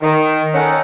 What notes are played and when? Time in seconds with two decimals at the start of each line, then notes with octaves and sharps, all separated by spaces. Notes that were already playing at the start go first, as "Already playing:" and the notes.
0.03 D#3
0.55 C#4 D#4 A4 F#5